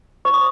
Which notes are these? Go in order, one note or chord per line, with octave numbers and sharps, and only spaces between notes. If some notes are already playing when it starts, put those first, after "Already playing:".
C5 C#6
D#6